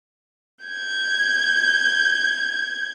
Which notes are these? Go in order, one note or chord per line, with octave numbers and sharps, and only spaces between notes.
G6 G#6